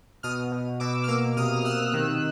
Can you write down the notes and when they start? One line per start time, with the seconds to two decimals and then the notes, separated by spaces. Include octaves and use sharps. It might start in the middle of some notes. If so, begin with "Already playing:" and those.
0.23 B2 D#6 F6
0.52 B2
0.80 B2 D6 E6
1.03 F6
1.08 A#3 D6 E6
1.37 C3 D#6 F6
1.65 C3 E6 F#6
1.94 D#3